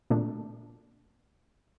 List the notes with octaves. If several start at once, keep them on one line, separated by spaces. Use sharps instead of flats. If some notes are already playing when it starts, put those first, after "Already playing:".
A#2 A3 D4